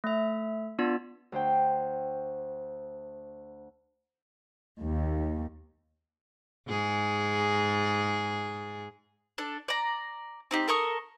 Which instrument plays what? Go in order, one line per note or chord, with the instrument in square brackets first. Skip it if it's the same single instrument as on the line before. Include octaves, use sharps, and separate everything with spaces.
[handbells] A3 E5
B3 D4 F4 D5
[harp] D2 C5 G5
[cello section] D#2
[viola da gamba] G#2 G#4
[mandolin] D4 A4
D5 A#5
C4 D#4 G4
A4 A#4 C#6 D#6